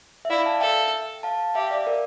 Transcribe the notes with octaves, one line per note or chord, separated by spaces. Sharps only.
E5
E4 D5 F5
F5 A5
A4 E5 G5
F5 A5
G4 E5 G5
D5 F5
A#4 D5